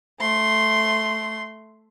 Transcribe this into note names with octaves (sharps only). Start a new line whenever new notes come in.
A3 C6